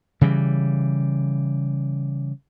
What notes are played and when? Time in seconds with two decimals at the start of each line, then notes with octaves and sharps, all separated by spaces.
0.21 C#3 E3 G3